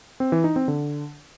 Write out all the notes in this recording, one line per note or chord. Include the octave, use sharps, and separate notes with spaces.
C4
E3
D#4
C4
D3